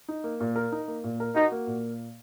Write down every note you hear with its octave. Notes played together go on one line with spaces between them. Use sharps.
D#4
A#3
A#2
A#4
D#4
A#3
A#2
A#4
D#4 F#4
A#3
A#2